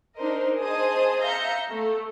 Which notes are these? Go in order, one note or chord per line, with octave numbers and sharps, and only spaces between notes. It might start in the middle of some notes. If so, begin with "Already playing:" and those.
D4 D#4 A#4 C5 D#5
G#4 C5 D#5 A5 D#6
E5 F5 A#5 G6 A#6 C#7
A3